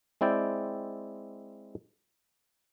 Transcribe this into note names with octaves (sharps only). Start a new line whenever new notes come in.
G#3 C4 E4 D5 G5